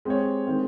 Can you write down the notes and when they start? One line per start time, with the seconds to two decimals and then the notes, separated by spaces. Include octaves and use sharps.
0.05 G#3 C4 G4 C#5
0.47 D#3 G#3 C4